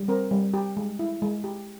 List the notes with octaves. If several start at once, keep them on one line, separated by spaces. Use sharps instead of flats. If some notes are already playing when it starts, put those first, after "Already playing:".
Already playing: G3
C4 A#4
G3
G4
G#3
E4
G#3
G4